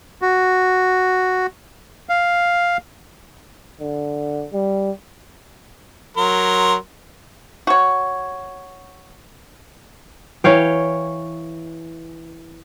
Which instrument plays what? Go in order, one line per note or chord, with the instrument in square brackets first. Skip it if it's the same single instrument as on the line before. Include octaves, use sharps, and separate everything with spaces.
[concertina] F#4
F5
[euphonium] D3
G3
[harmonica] F#3 A#4 C6
[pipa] F#4 C#5
[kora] E3 C#5 F5 G5